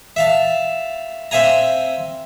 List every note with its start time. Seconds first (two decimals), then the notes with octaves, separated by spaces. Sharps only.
0.16 E5 F5 A5
1.31 C4 E5 F5 G#5 A#5